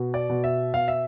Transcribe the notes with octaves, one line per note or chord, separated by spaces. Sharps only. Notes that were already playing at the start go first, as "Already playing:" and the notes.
Already playing: B2
D5
B2
E5
B2 F5
E5